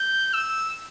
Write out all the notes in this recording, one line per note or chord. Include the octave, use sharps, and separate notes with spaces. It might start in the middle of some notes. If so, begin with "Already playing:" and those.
Already playing: G6
E6